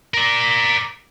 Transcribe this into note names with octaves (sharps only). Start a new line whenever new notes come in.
A#4 D5